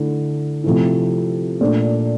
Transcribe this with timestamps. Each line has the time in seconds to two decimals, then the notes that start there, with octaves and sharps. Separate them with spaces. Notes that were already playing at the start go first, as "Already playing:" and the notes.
Already playing: D3 A3 E4
0.64 C3 F3 A3 C4 E4
1.61 A#2 A3 D4